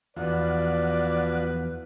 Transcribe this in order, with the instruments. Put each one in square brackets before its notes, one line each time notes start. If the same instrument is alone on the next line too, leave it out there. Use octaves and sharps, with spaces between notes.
[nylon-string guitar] E2 [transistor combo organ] F3 F#4 [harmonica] B4 D5